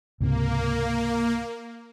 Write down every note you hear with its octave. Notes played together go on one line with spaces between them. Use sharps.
C#2 G#2 C3 A#3